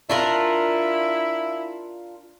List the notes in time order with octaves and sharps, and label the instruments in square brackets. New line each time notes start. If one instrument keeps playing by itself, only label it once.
[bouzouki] D4 F4 A#4 [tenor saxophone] E4